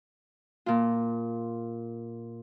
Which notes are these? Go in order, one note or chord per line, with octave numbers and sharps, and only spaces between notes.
A#2 F4